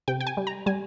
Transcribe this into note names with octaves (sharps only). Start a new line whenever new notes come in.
C3 G5
G5
G#5
G3
A#5
G3 G#5